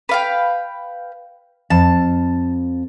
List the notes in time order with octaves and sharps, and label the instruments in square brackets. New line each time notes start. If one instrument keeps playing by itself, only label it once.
[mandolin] B4 F5 G5
[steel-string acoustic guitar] F2 [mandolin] A5